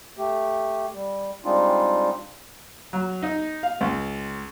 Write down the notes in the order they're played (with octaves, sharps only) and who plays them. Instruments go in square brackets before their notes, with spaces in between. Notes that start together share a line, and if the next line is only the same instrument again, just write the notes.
[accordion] A3 G4
G3
G3 G#3 C4 D4 D#4 F4
[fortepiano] F#3
D#4
F5
C#2